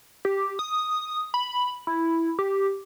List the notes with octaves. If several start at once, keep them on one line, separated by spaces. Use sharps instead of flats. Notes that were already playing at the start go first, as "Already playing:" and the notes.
G4
D#6
B5
E4
G4